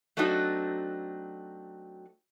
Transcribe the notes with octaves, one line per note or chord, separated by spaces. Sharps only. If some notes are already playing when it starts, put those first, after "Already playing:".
F#3 A3 C4 D4 D#4 F#4